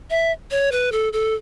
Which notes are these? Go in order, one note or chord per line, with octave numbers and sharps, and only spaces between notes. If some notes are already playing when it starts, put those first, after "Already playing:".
E5
C#5
B4
A4
A4